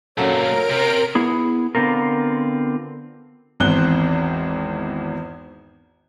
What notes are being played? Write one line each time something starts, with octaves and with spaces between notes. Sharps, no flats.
F#2 A#2 C#3 F#3 A4 A#4 C#5 D7
C3
B3 E4 G#4
D3 B3 C4 F4 A#4
G#1 E2 C4 F#6 G7